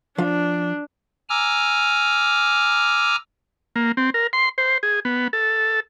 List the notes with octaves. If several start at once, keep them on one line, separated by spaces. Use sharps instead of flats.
F3 D4 F5
G#5 A#5 D6 E6 F6
A#3
C4
A#4
C6
C5
G#4
B3
A4